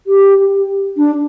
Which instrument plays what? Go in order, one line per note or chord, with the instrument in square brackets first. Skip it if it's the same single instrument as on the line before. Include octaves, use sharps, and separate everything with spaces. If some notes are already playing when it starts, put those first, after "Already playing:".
[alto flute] G4
D4